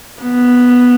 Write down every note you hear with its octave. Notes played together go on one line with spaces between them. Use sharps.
B3